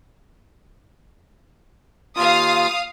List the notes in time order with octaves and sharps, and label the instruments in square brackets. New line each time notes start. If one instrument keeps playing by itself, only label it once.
[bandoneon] D#2 F4 [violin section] F5 D#6